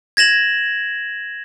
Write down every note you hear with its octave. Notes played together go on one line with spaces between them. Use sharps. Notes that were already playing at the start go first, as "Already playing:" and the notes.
G#6 A#6 E7 F#7